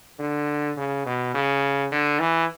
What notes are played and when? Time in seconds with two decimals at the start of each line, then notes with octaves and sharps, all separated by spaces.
0.19 D3
0.77 C#3
1.06 B2
1.34 C#3
1.92 D3
2.19 E3